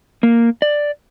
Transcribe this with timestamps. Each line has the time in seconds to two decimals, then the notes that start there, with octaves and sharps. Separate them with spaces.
0.23 A#3
0.62 D5